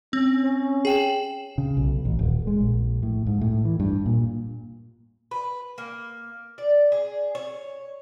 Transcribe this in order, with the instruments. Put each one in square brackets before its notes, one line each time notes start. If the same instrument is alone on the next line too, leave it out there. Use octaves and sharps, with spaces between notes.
[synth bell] C4 [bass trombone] C#4
[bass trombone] C#4
[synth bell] G#4 G5 E7
[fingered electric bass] C#3
B1
A1
D#1
G#3
A#1
A2
G#2
A2
E3
G2
A#2
[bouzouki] B4
A#3
D5
G#4
C#5